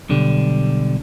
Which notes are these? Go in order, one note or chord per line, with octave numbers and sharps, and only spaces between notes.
B1 D3 G3